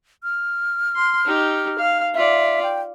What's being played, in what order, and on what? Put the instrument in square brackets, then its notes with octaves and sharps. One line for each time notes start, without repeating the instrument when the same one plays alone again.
[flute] F6
[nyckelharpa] C6
D#4 G4
F5
[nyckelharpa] F4 D5 [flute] E5
[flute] G5